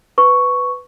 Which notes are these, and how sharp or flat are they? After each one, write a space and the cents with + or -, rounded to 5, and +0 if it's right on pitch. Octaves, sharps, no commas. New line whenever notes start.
B4 +10 C#6 +5